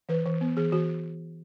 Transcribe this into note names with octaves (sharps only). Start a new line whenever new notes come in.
E3 B4
E3
B3
E3 G#4
E3 F#4